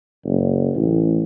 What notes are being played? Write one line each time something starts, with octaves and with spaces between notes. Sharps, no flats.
F#1
A1